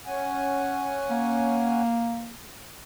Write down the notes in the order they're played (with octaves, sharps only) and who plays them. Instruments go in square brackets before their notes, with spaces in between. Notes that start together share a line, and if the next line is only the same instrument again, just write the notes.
[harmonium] C#4 F#5 G#5
[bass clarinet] A#3